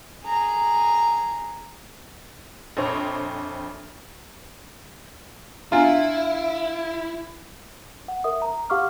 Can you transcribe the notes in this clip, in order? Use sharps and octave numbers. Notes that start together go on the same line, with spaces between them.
G#4 A#5
A#1 F2 C5 C#5
D4 E4 F4 G#5
F#5
A#4 E5 D#6
A#5
G4 F5 F#5 C#6 D6 F6